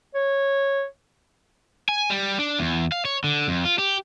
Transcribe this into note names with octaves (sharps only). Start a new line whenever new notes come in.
C#5
G#5
G3
D4
E2
F5
C#5
D3
F2
F4
G4